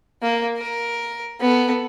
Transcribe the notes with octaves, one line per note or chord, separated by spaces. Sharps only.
A#3
A#4
B3 A4